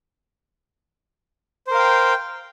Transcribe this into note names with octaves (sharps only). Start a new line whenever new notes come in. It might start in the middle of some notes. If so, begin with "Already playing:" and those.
A#4 C5 F5 G5